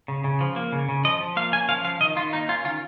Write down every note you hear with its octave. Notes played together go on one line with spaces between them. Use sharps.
C#3
C#3
F3
A#3
C#3
C#3
F3 D#5
F3
A#3 F5
C#4 G#5
F3 F5
F3 F5
D#3 D#5
D#3 F4
A#3 D#4
C#4 F4
D#3 F4